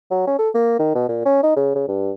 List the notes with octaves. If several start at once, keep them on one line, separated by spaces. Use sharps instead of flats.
F#3
C#4
A4
A#3
D#3
B2
A#2
C#4
D#4
C#3
C#3
G2